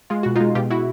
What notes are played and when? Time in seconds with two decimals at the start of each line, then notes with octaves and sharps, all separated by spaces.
0.10 G#3 F4
0.23 B2 F#4
0.36 D#4 F4
0.41 G#3
0.55 B2 F4 G4
0.70 E4 F#4